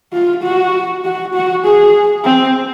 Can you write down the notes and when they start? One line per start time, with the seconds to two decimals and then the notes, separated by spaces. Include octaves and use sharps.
0.13 F4
0.43 F#4
1.04 F#4
1.34 F#4
1.65 G#4
2.24 C4